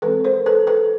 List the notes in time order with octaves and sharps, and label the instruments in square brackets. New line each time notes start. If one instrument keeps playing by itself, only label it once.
[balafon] E3 G#3 C4 A4 B4
A#4 C5
A4 B4
A4 B4